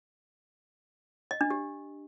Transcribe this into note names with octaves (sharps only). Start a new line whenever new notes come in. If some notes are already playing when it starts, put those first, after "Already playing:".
D#5
D4
G4